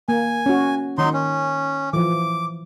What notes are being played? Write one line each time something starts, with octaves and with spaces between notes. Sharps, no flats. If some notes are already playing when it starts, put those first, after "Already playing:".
A#3 G#5
C#4 F#4
D#3 F#3 D#4 C6
C#4
E3 F3 D6